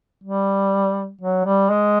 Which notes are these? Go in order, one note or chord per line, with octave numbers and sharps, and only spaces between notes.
G3
F#3
G3
G#3